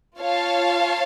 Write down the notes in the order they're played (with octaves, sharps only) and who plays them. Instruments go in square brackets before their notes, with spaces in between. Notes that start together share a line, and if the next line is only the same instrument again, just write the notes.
[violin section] F4 C#5 F5 A5